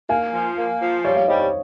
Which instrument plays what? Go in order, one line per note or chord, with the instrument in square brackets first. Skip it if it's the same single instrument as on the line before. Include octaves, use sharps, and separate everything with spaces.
[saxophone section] A#3 [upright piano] F5 G#5
[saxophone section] F3
A#3
F3
[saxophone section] G3 [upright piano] C#5 F5
[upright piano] C#5 F5
[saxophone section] G3 [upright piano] C5 D#5
[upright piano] C#5